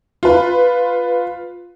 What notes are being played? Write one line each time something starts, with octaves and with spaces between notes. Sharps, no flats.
F4 B4